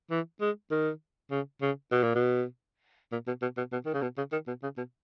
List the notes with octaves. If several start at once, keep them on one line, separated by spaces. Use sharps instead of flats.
E3
G#3
D#3
C#3
C#3
B2
A#2
B2
A#2
B2
B2
B2
B2
D#3
C#3
B2
C#3
D#3
B2
C#3
B2